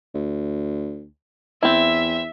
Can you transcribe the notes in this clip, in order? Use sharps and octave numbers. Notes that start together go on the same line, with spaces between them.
D2
E2 C4 E4 E5